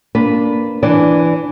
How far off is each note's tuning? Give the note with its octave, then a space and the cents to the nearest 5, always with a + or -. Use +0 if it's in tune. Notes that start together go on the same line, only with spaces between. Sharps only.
A#3 +0 D4 -15 B4 +0
E3 +10 D4 +0 D5 +0